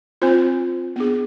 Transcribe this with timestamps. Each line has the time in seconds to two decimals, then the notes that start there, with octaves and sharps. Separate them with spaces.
0.22 C4 F4 C5
0.96 B3 D4 G#4